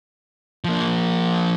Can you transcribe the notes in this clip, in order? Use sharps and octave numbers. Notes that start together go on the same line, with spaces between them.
F3 A#3